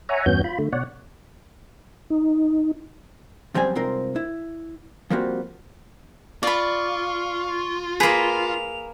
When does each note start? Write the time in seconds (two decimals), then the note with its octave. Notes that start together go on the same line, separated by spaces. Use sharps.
0.09 C#5 E5 F#5 G#5 A#5
0.26 E2 G2 B3 C#4 F#4 G6
0.44 F4 B5
0.59 D3 A3
0.73 B2 C#5 D5 F#5
2.10 D#4
3.54 F#2 F3 G3 C4 G#5
3.75 C2 G#2 C4 F4 A#4
4.16 E4
5.10 F3 G3 A#3 C4 F#4
6.43 F4 D5 B5 C#6
8.00 A#3 G#4 B4 F7